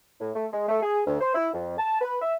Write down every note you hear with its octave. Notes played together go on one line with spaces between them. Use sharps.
A2
A3
G#3
A3
G#4
D2
C5
E4
F2
A5
B4
E5